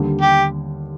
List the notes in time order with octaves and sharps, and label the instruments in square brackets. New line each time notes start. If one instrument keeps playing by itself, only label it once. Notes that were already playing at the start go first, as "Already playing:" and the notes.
Already playing: [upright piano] D#2 D3 G3
[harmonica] G4